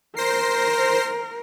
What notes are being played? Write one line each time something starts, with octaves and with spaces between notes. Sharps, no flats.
A#4 C5 A#6 C7